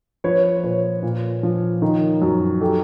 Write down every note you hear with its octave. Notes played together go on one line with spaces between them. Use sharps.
F3 B4 C#5
C5
A#2 B4 C#5
A#2
F3
D#3
F#2
G4 A4